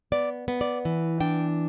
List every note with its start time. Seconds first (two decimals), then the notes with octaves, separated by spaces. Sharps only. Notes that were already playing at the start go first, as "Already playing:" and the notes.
0.12 B3 D5
0.48 B3
0.61 D5
0.85 E3
1.20 D4 G5